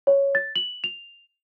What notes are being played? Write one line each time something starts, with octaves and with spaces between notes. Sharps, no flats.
C#5
A6
F#7
F7